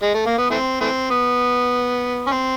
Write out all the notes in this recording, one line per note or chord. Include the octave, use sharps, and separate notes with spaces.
G#3
A3
A#3
B3
E3 A3 C4
E3 A3 C4
B3
C#4
C4